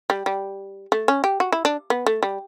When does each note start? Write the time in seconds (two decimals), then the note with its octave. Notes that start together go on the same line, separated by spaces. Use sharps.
0.10 G3
0.26 G3
0.92 A3
1.08 C#4
1.24 G4
1.40 F#4
1.52 E4
1.65 D4
1.90 B3
2.06 A3
2.23 G3